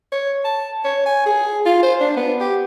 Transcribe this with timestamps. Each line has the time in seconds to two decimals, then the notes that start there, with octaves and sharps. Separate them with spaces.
0.12 C#5
0.45 A5
0.84 C#5
1.06 G#5
1.26 G#4
1.66 F4
1.83 C5
2.00 D4
2.17 B3
2.41 G4